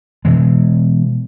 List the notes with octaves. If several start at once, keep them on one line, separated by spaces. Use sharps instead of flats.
B2 E3 G#3